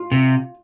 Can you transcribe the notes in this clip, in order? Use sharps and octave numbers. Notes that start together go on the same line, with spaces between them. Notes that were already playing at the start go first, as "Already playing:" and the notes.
Already playing: F4
C3